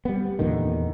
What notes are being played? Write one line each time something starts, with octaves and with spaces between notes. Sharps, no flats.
G3 B3
E2 A#2 D3 D#3